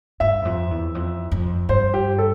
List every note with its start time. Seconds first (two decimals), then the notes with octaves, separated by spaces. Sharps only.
0.20 G2 E5
0.42 E2
0.45 F2
0.71 E2
0.95 F2
1.32 F2
1.69 G2 C5
1.94 G4
2.18 A4